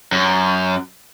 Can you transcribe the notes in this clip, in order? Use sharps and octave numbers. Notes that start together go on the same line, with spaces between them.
F#2